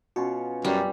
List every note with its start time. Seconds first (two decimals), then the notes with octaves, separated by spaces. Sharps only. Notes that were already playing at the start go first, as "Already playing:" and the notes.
0.16 B2 C#4 F4 F#4
0.65 F#2 G3